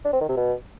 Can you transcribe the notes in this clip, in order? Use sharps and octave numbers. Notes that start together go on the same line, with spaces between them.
D4
C4
D#3
C3
B2